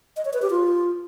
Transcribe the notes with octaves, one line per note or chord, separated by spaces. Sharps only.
D#5
C#5
B4
G4
F4